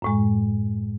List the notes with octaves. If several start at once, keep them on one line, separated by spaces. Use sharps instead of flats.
F#2 A2 G#3